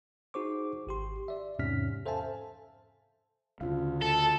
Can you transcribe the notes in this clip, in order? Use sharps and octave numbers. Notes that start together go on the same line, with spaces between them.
D#4 F#4 G#4 C5 C#6 D6
G#1 G4 C6
D5 E5
E2 G#2 C3 C#4 F6 B6
A4 C5 E5 F5 G#5 A5
D2 C#3 F4 F5
A4 A5